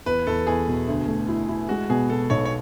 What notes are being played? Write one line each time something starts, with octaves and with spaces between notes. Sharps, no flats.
E2 B4
E2 A4
E2 G#4
B2
D2
A3
E4
E4
G#3 F#4
B2 G#4
B2 A4
B1 C#5
C#5